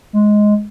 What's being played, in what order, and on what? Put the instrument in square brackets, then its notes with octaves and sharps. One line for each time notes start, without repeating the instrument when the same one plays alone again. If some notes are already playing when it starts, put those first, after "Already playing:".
[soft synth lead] G#3